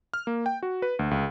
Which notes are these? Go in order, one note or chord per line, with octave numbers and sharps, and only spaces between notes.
F6
A#3
G5
F#4
B4
D2
C#2